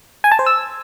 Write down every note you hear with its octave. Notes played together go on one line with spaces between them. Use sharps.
G#5
A5
C5
E6